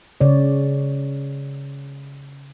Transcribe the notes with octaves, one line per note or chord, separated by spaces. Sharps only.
C#3 C#5 D5